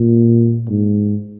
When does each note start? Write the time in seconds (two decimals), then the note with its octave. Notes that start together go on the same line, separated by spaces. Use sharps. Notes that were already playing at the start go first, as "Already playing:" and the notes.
Already playing: A#2
0.69 G#2